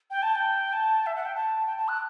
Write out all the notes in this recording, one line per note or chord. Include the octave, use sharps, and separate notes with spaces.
G5
A5
G5
A5
E5
F#5
G5
A5
G5
A5
F#6